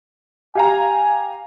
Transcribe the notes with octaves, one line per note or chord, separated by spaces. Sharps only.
G4 F5 G#5 A#5